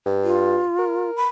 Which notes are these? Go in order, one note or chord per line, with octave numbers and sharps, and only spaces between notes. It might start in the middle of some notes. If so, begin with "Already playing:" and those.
G2
F4
A#4
B5